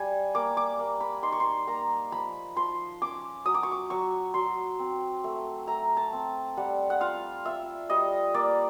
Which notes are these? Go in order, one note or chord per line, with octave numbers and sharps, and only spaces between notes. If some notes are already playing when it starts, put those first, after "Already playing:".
Already playing: G3 G#5
A#3 D6
D6
A#3
B5
D#4 C6
C#6
C6
A#3 A#5
F3 B5
F3 C6
C#4 D6
F#3 D#6
D6
C#6
D6
F#3 C#6
F#3 C6
C4
A3
A3 A#5
A5
C4
G3 F#5
F#5
F4 F5
F4 E5
G3 D#5
A#3 D5